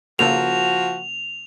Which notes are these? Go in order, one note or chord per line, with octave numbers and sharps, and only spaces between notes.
C#3 F3 A#3 F#4 A4 F7